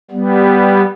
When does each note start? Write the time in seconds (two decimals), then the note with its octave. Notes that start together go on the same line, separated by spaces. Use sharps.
0.11 G3 B3